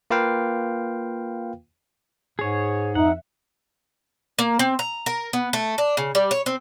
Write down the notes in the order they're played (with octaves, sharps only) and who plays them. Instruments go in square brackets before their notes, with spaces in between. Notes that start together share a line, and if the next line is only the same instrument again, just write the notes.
[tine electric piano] A#3 F4 B4 F5 G5
[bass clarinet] G#2 [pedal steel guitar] G#4 C#5
[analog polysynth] F2 E5 [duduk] D#4 [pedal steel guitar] F#5
[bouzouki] A#3
C4
A#5
A#4
B3
A3
D4
C#3
G3
C#5
C4